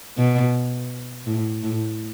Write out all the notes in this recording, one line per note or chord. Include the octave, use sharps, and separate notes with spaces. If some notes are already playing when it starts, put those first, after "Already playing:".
B2
A2
A2